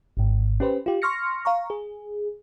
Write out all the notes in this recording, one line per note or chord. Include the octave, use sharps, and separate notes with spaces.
G#1 G#2
C#4 G4 B4 C5
F4 G4
C6 C#6 F6 A#6 C#7
F5 A#5 C#6
G#4